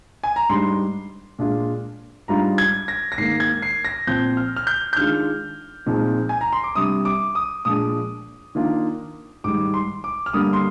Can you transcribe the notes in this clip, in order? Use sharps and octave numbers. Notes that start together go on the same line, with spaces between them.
G#5
A#5
G#2 G3 D4 C6
A#2 G#3 D4 F4
G#2 G3 D4 F4 A#5
G#6
A#6
A#6
G#2 D#3 A#3 C7
G#6
C7
A#6
A#2 F3 C4 G6
F6
F6
G6
G6
D#3 G#3 D4 F4 F6
A#2 F3 G#3 C4 D#4
G#5
A#5
C6
D6
C3 G3 D4 D#6
D6
D#6
A#2 F3 G#3 D4 D#6
D#3 A#3 D4 F4
G#2 D#3 G3 D6
C6
D6
F6
G2 D3 G3 A#3 D#6
C6